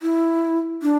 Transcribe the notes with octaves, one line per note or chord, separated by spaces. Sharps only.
E4
D4